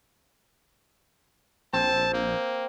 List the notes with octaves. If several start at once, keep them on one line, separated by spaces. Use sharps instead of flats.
A#1 C4 A5
A#3